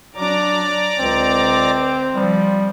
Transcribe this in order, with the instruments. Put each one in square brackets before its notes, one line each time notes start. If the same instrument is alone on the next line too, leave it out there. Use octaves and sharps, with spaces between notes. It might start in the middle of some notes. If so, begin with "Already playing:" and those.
[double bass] F#3 D4 [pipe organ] D5 A#5 D6
[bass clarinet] C#2 [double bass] D3 [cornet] C4
[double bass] F3 [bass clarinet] G3